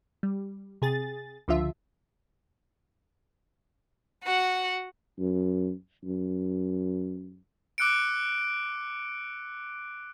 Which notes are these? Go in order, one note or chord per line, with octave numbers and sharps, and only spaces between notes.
G3
C3 G#4 A6
C#2 D3 F3 F4 E5
F#4 F#5
F#2
F#2
D6 E6 F#6 C#7 D7